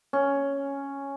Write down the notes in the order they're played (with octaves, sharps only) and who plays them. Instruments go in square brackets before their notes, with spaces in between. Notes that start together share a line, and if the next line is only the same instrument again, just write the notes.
[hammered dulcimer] C#4